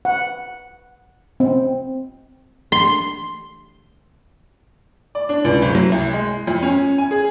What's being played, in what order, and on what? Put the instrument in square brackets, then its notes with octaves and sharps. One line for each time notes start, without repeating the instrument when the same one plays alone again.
[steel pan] F#5
C4
[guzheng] C6
[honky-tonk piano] D5
D4
C#2
F#1
F#3
C2
G#3
F2
C#4
G#5
G#4